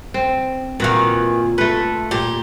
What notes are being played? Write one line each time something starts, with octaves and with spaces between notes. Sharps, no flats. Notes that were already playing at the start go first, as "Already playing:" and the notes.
C4
A#2 D#3 E3 F4 F#4 F5
A3 A4 B4
A#2 G4